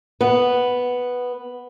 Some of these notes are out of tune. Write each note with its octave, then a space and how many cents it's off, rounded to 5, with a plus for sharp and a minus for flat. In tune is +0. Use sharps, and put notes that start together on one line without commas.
B3 +0